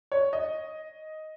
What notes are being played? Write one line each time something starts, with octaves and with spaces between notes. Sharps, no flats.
C#5
D#5